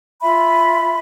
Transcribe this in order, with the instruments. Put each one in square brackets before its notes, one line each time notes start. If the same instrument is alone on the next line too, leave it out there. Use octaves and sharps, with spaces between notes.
[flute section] F4 E5 B5